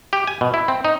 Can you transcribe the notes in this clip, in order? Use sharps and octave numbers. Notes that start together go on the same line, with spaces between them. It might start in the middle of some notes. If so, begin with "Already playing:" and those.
G4
G#5
B2
E4
C4
D#4